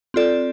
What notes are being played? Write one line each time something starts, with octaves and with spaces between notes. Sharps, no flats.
C4 F4 A4 D5